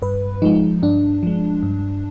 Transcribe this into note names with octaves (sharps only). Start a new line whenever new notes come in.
G2 B4
F3 G#3 D#4
G2 D4
F3 G#3
G2